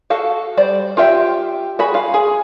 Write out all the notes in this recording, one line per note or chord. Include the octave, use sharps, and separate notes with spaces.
F#4 A4 F5
G3 C5 D5
F4 G4 E5 G5
F#4 G#4 B5
F4 F5
G#4